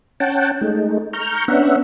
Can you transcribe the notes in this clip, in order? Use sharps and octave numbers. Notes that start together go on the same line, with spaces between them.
C#4 F#5 G5 A5
G#3 A3 D#4
A#5 C#6 F6 G6
B3 C#4 D4 E5 F#5